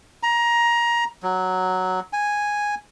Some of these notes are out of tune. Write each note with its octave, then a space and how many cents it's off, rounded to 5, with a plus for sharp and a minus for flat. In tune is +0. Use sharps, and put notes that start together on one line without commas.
A#5 +20
F#3 +0
G#5 -5